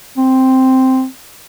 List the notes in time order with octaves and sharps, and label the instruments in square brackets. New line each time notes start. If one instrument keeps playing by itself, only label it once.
[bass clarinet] C4